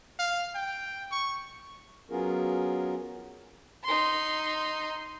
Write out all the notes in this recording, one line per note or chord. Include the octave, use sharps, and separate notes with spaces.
F5
G5
C#6
F#3 B3 C#4 F4 G#4 A#4
D#4 C6